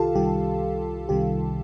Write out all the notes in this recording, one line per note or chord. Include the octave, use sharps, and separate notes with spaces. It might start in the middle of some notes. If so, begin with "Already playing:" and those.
Already playing: C2 C3 D#3 F4 G4 A4 F5 A5
C2 C3 D#3 G3 G4
C2 C3 D#3 G3 G4